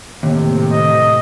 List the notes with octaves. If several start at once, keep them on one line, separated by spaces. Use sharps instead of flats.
D#2 A2 C3
D#5